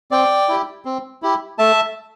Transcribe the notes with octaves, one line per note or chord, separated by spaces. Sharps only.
C4 D5 G5
E4 G4
C4
E4 G4
A3 E5 A5